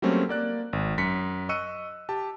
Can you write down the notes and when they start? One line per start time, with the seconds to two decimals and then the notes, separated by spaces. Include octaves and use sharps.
0.02 F#3 G3 A3 A#3 C4 C#4
0.29 A#3 D5 F#6
0.73 G#1
0.98 F#2 B6 C#7
1.49 D#5 C#6 E6 F#6 C#7 D#7
2.09 G4 A5